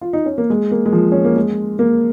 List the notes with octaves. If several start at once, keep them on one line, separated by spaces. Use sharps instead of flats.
F4
D#4
C#4
A#3
G#3
A#3
G#3
F3
C#4
A#3
G#3
A#3